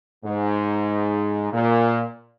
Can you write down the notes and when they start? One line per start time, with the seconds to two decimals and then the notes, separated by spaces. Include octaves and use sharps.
0.24 G#2
1.53 A#2